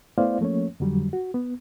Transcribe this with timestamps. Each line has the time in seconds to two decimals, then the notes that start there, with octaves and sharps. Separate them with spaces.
0.18 A3 B3 E4 C5 D5 F5
0.41 F3 A3 A#3 C#4 C#5
0.80 F2 D3 F#3 G3
1.13 F#4
1.34 B3